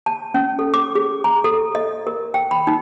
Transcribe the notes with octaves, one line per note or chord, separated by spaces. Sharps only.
A5
C#4
A4
D6
G#4
A#5
A4
D#5
A#4
G5
B5
D#4